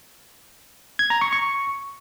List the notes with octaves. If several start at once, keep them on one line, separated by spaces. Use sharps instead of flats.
G#6
A#5
C#6
C#6